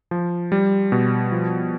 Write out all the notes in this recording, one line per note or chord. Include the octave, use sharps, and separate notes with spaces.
F3
G3
B2
F3